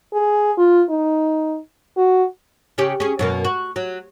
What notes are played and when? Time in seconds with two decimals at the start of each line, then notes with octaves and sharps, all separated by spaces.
0.13 G#4
0.58 F4
0.89 D#4
1.97 F#4
2.78 C#3 C#4 G4
3.00 C#4 G#4
3.19 F#2 B2 A#3
3.44 F#4
3.76 F#3